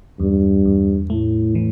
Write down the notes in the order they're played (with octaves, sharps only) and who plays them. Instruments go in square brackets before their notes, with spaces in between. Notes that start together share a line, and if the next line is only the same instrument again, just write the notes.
[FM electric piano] E2 [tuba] G2
[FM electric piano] E2
[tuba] A2 [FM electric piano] A3
[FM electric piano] E3